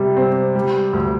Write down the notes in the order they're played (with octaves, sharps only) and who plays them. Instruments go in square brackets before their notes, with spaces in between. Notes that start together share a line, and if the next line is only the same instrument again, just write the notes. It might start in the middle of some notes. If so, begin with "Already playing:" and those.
Already playing: [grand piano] C3 G3
C4
G3
D2